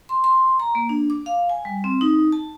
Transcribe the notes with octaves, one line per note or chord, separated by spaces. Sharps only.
C6
C6
A#5
A#3
D4
D6
F5
G#5
G3
C4
D#4
A5